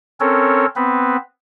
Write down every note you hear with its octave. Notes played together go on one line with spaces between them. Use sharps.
C4 C#4 A4 A#4 C#5
B3 C4 B4